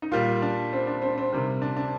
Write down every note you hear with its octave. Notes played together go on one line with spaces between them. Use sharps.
D#4
A#2 G3 F4
D4
C4
D4
C4
C4
C3 D#3 G3
D4
D4